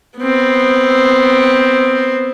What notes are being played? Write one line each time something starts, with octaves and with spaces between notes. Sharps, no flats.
B3 C4